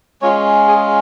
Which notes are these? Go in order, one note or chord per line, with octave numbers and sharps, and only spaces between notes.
G#3 C#4 F4 C#5
G#4